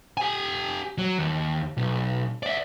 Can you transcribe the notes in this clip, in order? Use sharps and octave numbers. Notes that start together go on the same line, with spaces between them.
G4 G#5
F#3
D#2
B1
D5 E5